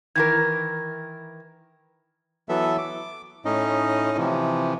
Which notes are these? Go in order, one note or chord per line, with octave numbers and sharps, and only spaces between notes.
D#3 E3 A#4 G#6
E3 F#3 B3 A4 E5
D6
A2 C#4 D#4 D#5
C3 E3 F3